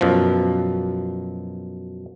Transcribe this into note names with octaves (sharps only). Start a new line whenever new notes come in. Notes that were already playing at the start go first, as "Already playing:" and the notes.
F#2 B2 F3